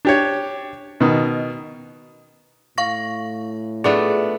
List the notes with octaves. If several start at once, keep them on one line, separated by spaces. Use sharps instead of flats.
D4 G4 C#5
B2 D#3
A2 F5 C#6 A#6
A3 B3 D4 F4 G#4 D5